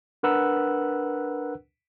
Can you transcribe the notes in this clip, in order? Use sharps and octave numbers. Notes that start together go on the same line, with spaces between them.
D4 A#4 B4 F#5 E6 F#6